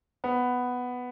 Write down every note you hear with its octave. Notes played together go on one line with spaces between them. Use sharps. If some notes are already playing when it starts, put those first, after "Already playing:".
B3